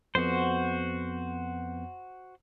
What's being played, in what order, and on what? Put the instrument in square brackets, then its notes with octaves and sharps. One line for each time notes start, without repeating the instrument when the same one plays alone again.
[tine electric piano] F2 B3 [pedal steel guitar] F#4 C5